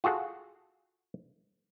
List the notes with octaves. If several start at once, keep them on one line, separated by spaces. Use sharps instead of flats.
F4 F#4 G#4 A4 F#5